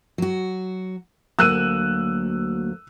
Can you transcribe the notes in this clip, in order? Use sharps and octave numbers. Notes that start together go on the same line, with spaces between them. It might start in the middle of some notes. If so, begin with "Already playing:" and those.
F#3 F#4
D2 F#3 A#3 E6 F#6 D#7